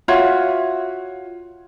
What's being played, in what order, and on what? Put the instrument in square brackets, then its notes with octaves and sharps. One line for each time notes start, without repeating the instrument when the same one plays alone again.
[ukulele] F4 F#4 C#5 E5